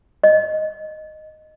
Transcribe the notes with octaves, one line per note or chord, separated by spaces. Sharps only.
D#5